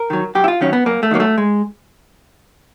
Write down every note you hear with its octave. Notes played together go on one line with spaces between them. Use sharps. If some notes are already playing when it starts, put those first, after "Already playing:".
Already playing: A#4
D#3 F#3
F#2 G4
E4
F4
D#3 F#3 C#4
B3
F#2 A#3
A3
D#3 F#3 A#3
A3
G#3